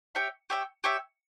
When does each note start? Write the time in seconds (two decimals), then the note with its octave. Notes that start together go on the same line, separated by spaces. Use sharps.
0.15 G4 C#5 E5 G5
0.50 G4 C#5 E5 G5
0.84 G4 C#5 E5 G5